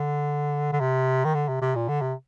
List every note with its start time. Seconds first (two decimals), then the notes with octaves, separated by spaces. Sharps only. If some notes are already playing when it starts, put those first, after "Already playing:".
Already playing: D3
0.73 D3
0.80 C3
1.25 D#3
1.34 D3
1.49 C3
1.62 C3
1.76 A#2
1.88 D3
2.01 C3